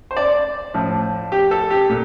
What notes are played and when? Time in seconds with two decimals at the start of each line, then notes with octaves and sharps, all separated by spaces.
0.11 C5
0.17 D5
0.74 A2 F3
1.32 G4
1.51 A4
1.70 G4
1.89 A#2